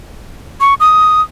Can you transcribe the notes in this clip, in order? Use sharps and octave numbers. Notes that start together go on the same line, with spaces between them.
C#6
D#6